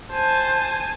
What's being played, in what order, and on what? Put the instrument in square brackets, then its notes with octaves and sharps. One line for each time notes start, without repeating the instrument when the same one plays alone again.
[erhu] C5 [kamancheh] G#5 A5